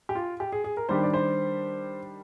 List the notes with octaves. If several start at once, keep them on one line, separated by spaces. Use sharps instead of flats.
G4
F4
G4
G#4
G#4
A#4
D#3 G3 D4 G4 C5
D5
C5